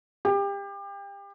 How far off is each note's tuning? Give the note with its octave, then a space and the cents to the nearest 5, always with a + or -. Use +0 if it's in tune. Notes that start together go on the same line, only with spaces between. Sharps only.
G4 +30